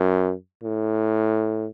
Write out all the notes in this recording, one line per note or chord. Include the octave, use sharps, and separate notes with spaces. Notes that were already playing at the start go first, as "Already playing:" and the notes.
Already playing: F#2
A2